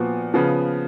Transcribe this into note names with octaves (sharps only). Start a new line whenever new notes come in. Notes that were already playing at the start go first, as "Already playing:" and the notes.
Already playing: A#2 F3 B3 F#4
C#3 F3 B3